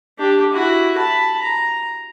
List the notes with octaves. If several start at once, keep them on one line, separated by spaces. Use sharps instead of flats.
D4 G4
E4 F#4
A5 B5
A#5